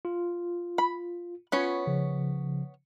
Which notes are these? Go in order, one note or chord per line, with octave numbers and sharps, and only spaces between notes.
F4
B5
B3 C#4 F4 C#5 B5
C#3 F3